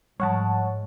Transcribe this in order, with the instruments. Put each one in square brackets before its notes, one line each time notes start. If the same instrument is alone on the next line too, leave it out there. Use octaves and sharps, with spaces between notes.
[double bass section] G#2 [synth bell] F3 G3 [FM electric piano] C#5 F#5 A5